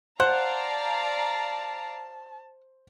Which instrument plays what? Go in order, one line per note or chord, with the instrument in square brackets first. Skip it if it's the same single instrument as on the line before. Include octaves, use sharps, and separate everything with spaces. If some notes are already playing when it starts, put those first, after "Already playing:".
[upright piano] C5 [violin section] D5 F5 A#5 [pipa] F#5 [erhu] A5